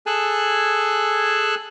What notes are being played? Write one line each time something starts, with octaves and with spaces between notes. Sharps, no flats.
G#4 A4 G#5 A5 E6 F#6